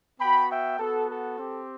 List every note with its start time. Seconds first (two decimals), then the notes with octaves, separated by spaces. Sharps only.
0.20 B3 F#4 G5 B5
0.49 E5 G5
0.79 B3 F#4 A4
1.09 A4
1.39 C4 G4